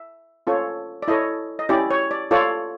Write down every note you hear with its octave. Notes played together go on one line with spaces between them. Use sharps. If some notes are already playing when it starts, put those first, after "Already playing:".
Already playing: E5
C#4 F4 A4 C#5
D5
E4 A4 C#5 D#5
D#5
C#4 E4 G4 D5
C#5
D5
F4 A4 C#5 D5